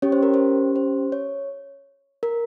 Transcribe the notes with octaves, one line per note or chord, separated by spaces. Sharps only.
C#4 G4 C#5
C5
A#4
C5
C5
C#5
A#4